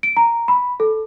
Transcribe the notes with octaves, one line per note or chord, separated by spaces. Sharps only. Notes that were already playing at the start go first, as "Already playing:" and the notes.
D7
A#5
B5
A4